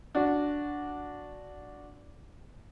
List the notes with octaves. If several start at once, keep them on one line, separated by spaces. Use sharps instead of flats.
D4 F#4